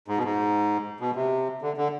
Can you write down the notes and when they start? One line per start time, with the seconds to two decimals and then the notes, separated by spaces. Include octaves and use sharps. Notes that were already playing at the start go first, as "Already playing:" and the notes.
0.08 G#2
0.17 B2
0.24 G#2
1.00 B2
1.16 C3
1.62 D3
1.77 D3